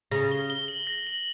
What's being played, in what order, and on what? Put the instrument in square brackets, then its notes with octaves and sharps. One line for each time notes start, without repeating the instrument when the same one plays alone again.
[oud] C#3 [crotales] A#6
[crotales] G7
G7
F#7
A#6
F#7